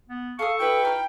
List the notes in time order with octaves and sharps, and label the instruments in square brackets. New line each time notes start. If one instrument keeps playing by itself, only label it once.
[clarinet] B3
[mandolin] A4 D#6 [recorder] F5 [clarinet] C#6
[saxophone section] E4 F#4 B4 [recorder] G5
[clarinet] D#4 [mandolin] F6